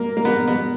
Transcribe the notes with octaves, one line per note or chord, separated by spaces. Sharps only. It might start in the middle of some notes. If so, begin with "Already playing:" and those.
Already playing: A#3
A#3
B3
B3